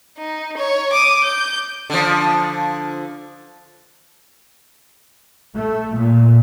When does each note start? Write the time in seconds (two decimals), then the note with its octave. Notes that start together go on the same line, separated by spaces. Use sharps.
0.18 D#4
0.57 C#5
0.93 D6 D#6
1.24 G6
1.90 D3 F3
5.55 A3
5.93 A#2